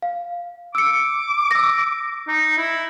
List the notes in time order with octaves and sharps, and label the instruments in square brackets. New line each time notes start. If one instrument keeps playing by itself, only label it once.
[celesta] F5
[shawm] D6 [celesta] E6 C#7
[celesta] E6 A#6
[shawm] D#4
E4